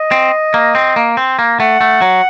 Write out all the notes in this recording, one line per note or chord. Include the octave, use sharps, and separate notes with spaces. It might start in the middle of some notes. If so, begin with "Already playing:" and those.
Already playing: D#5
C4
A#3
C4
A#3
C4
A#3
A3 F#5
A3
F#3